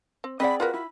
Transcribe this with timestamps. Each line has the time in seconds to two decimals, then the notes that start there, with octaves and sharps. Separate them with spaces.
0.24 C4
0.40 C4 G#4 D5 D#5 F#5 B5
0.60 F4 F#4 A#4 B4
0.74 E4 B5